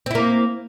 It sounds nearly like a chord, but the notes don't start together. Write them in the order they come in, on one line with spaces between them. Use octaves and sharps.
C4 E4 A#3